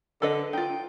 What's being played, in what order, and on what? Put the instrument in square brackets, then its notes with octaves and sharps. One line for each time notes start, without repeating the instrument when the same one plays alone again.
[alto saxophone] D3 [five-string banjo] A4 B4 D#5
[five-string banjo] D#4 F4 [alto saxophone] G5